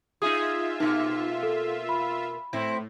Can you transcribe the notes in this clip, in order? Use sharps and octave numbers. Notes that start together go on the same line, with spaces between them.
D#4 F4 G#4 E5 D#6
B2 A#3 D#4
A4
B5
A2 C4 E4